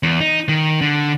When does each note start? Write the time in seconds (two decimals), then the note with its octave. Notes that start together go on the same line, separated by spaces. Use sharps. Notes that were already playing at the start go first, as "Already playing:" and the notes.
0.03 E2
0.21 D#4
0.49 D#3
0.81 D3